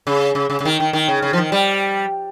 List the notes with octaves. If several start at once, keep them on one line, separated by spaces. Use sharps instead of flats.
C#3
C#3
C#3
C#3
D#3
D#3
D#3
C#3
C#3
F3
D#3
G3